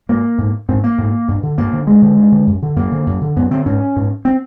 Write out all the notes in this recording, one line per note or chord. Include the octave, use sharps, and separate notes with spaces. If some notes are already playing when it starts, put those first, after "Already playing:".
G#2 A#3
G#2
G#2 C4
A#3
G#2
G2
D3
G2 A#3
D3
G2 G#3
D3
G2
D3
F#2
D3
F#2 A#3
D3
F#2
D3
F#2 B3
D3 C4
G#2 C#4
G#2
C4